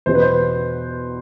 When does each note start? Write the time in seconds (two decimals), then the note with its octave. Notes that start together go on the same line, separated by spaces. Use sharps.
0.06 E2 B2 B3 C5
0.15 B4
0.22 C5